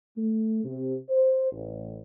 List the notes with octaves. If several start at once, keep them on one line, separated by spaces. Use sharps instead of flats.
A3
C3
C5
A1